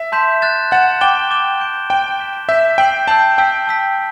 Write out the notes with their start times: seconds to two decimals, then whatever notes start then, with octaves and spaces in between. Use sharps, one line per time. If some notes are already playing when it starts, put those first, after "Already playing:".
Already playing: E5
0.12 A5 C6 G6 B6 E7
0.42 F#6 A6 E7
0.71 F#5 F#6 A6 E7
1.01 G5 D6 A6 E7 G7
1.31 D6 A6 E7 G7
1.60 G6 D7 G7
1.90 G5 G6 D7 G7
2.19 G6 B6 E7
2.49 E5 G6 B6 E7
2.78 G5 E6 G6 C7 F#7
3.08 A5 E6 G6 C7 F#7
3.38 G5 A5 E6 B6
3.67 A5 E6 B6